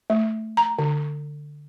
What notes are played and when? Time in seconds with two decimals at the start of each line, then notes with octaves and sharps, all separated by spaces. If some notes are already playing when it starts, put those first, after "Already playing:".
0.10 A3
0.57 A#5
0.79 D3